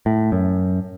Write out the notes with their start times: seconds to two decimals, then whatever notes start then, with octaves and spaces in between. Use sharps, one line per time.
0.06 A2
0.32 F#2